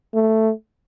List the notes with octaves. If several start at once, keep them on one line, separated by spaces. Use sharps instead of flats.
A3